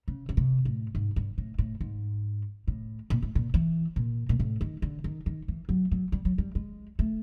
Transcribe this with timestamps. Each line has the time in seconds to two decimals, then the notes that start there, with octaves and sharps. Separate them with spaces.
0.08 C#3
0.29 C#3
0.37 C3
0.65 A2
0.95 G#2
1.16 G2
1.38 A2
1.58 A2
1.81 G#2
2.68 A2
3.10 A#2
3.22 A2
3.35 A#2
3.54 E3
3.96 A#2
4.29 A#2
4.39 A2
4.61 D#3
4.82 D3
5.04 D#3
5.26 D#3
5.48 E3
5.69 F#3
5.91 F#3
6.12 G3
6.25 F#3
6.38 G3
6.55 G#3
6.99 A3